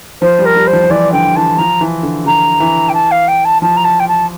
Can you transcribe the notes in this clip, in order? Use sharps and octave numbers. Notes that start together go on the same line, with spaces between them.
F3 C5
G3
A#4
G3
C5
F3
F3
E3 D5
D3 G5
E3 A5
F3 A#5
E3
D3
D3 A#5
E3
G5
A5
F5
G5
A5
F3 A5
A#5
A5
G5
A5